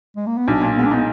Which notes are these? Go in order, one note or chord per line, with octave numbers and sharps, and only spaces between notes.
G#3
A#3
B3
B1 D4
A#2
G#3 B3
D4
B3 D#4